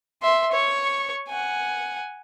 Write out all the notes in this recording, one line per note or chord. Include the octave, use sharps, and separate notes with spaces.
E5 C6
C#5 C#6
F#5 G#5